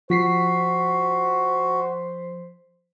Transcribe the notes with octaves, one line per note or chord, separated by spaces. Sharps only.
F3 F#4 C5 B6 C7